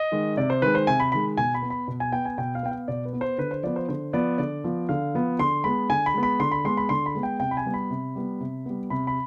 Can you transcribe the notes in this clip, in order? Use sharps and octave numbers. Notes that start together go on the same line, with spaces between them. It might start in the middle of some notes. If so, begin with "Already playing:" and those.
Already playing: D#5
D#3 G#3
C3 D5
C5
D#3 G#3 B4
C5
C3 G#5
B5
D#3 G#3 B5
B2 G#5
B5
B3
B5
B2
G#5
B3 G5
G#5
B2 G5
F5
B3 G5
F5
B2 D5
B4
B3
C5
D3 B4
C5
F3 B3 D5
C5
D3 C5
F3 B3 D5
D3 D5
F3 B3
D3 F5
F3 B3
D3 C6
G#3 B3 B5
D3 G#5
B5
G#3 B3
B5
D3 C6
B5
G#3 B3 C6
B5
D3 C6
B5
G#3 B3
G5
C3 G5
B5
G#5
G3 B3
B5
C3
G3 B3
C3
G3 B3
C3 B5
B5